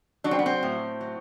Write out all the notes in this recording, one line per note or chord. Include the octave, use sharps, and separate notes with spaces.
F#3 D4
C4
B3
C4
A2
F#3